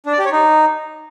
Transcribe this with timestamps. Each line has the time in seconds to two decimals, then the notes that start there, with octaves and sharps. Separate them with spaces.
0.06 D4
0.12 D5
0.19 G4
0.25 C#5
0.32 D#4